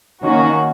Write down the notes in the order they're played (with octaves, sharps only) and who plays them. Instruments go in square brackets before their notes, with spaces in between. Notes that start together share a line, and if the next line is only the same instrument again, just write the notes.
[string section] D#3 A#3 C#4 F#4